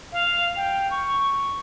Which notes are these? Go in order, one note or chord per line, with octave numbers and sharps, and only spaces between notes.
F5
G5
C#6